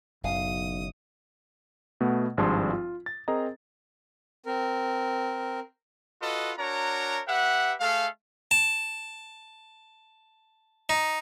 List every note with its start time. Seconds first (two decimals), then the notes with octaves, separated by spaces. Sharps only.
0.24 F#1 B1 F#2 F5 D#6
2.00 B2 A3 B3
2.37 G#1 G2 F3 G#4 A5 C6
2.73 F4
3.06 A6
3.28 C4 G#4 A#4 D#5 A#5
4.46 C4 A#4
6.22 F4 F#4 A4 B4 D#5
6.58 D4 F#4 A#4 C#5 A#5
7.28 G4 B4 E5 F#5
7.80 A3 G#4 A4 F5
8.51 A5
10.89 D#4